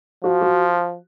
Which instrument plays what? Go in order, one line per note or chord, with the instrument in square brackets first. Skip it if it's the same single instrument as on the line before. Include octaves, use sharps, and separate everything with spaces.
[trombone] F3 [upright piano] F#4
[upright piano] F#4